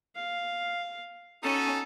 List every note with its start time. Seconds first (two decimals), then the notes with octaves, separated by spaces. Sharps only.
0.15 F5
1.43 C#4 D#4 F#4 A4 G#5